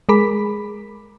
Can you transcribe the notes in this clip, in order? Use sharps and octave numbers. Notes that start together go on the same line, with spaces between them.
G#3 G#4 A#4 B5 D6 B6